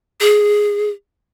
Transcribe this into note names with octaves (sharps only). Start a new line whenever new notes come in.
G#4